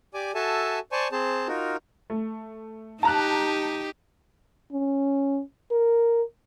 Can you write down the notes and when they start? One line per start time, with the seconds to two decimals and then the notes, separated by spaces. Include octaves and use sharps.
0.14 G4 D5 G#5 D6
0.35 F#4 A4 E5 G#5 A5
0.92 C5 D5 G#5 A5 C#6
1.12 C4 G#4 C5 A5
1.48 D#4 F4 F#4 A#4
2.10 A3
3.03 D#4 G4 A5 A#5 F#6
4.72 C#4
5.71 A#4